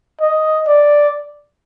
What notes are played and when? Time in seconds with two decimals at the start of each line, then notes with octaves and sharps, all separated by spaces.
0.21 D#5
0.67 D5